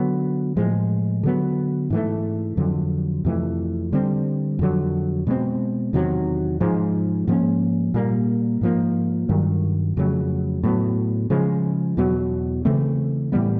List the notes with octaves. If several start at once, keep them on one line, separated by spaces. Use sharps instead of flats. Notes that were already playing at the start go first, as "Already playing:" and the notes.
Already playing: D3 F#3 B3
A2 F3 G#3
D3 F#3 B3
G#2 E3 A3
F2 D3 F#3
F2 C3 E3 A3
D3 G3 C4
F2 D3 F#3
B2 G#3 C4
E2 C3 D#3 F#3
G#2 F3 G#3
G#2 F3 A#3 C#4
A#2 G3 A#3
G#2 F3 A#3
G2 D#3 F#3
F2 C#3 F#3 A3
A2 F#3 B3
C#3 F3 G#3
E2 B2 F#3
C#3 E3 A3 C4
A2 E3 G3 B3